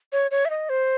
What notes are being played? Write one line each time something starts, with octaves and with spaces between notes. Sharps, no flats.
C#5
C#5
E5
D#5
C5